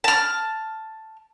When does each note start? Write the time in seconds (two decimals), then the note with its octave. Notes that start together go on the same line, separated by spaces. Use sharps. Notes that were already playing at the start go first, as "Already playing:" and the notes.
0.04 A5 F6